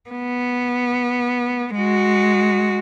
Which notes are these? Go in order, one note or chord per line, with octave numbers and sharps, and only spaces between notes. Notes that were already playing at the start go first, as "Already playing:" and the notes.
B3
G#3 F#4